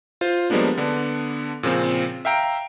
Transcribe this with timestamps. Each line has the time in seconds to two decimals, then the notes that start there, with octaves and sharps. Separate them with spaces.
0.21 F4 C5
0.50 F3 G3 G#3 A#3 B3 D4
0.78 D3 B3 D4
1.63 A#2 C#3 F3 C4
2.25 E5 F5 G5 A#5 D7